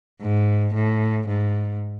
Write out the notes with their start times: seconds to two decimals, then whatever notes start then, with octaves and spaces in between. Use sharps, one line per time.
0.22 G#2
0.75 A2
1.28 G#2